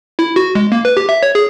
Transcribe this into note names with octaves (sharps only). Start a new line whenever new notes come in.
E4
F#4
G#3
A#3
B4
G4
E5
C#5
G#4